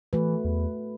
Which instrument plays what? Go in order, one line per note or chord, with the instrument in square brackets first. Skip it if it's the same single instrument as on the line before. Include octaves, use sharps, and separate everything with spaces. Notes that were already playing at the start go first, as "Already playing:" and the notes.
[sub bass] E3 [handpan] A3 F#4 B4
[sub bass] E2